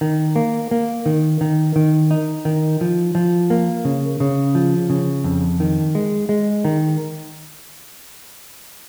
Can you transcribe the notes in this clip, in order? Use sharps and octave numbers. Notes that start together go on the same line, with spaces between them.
D#3
A#3
A#3
D#3
D#3
D#3
D#4
D#3
F3
F3
A#3
C#3
C#3
F3
C#3
F2
D#3
G#3
G#3
D#3